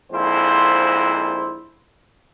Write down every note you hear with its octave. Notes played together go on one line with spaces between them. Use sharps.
A#1 F2 G#2 E4 C5